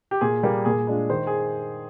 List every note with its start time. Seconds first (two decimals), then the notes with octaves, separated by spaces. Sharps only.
0.11 G4
0.21 A#2 G#4
0.43 G3 A#3
0.65 A#2 G#4
0.87 G#3 D4 F4
1.10 D#3 C5
1.27 G#4